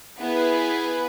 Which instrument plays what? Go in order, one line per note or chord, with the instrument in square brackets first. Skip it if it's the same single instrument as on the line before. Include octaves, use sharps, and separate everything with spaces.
[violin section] B3 E4 G#4 B4